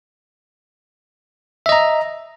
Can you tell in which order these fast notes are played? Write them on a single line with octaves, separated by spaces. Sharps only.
E5 D#5 A#5